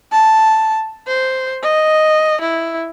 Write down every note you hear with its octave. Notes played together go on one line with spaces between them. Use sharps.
A5
C5
D#5
E4